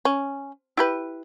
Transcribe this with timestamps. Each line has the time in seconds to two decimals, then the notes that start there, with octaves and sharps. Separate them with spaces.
0.05 C#4
0.77 E4 G4 B4